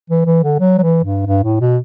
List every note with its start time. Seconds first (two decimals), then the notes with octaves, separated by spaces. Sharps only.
0.10 E3
0.26 E3
0.44 D3
0.60 F#3
0.78 F#3
0.82 E3
1.04 G2
1.26 G2
1.43 A2
1.60 B2